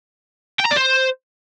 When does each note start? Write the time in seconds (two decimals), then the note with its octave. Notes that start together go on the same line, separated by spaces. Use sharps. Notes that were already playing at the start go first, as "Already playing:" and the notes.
0.60 G5
0.66 A#5
0.71 D5
0.77 C5